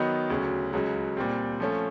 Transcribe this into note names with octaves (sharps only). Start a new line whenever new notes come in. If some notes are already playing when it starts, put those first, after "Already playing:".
Already playing: D#3 F#3 B3 D#4
D2 C#3 F#3
C#2 C#3 F#3
A#2 G3 C4
F3 A3 C#4